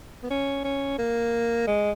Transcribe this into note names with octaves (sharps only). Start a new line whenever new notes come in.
B3
C#4
C#4
A#3
G#3